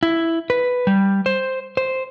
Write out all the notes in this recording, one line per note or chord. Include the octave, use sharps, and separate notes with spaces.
E4
B4
G3
C5
C5